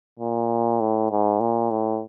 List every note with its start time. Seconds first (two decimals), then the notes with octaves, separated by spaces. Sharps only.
0.19 A#2
0.80 A2
1.10 G#2
1.40 A#2
1.71 A2